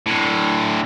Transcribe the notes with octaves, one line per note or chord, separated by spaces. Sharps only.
A2 D3